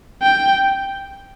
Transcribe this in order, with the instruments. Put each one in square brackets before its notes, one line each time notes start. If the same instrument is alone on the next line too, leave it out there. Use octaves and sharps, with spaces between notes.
[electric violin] G5